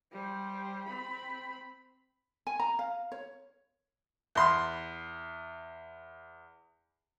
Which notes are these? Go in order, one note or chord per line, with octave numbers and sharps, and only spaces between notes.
G3 C5
C4 B5
G#5
A#5
F5
C#5
E2 C6